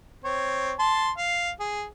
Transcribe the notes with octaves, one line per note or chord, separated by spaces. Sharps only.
C4 C#5
A5 C6
F5
G#4